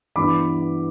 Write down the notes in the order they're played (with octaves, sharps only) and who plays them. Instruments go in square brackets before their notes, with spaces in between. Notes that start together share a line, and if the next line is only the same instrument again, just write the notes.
[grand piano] G2 E3 B3 D4 B5 D6